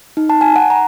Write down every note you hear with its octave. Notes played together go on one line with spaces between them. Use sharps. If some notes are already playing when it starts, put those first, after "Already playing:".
D#4
A5
G#5
F#5
A#5